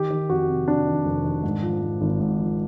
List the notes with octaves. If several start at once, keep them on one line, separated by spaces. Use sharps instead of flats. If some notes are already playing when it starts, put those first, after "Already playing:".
Already playing: D#3 G4
D#3
F2 F#4
C3
C3 D4
D#3
F1
D#3
G#2
F3
G#2
G#1
G#2
F3